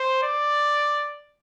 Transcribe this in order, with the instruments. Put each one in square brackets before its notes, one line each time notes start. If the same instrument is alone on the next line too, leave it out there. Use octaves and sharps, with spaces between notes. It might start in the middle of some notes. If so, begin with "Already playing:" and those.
Already playing: [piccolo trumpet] C5
D5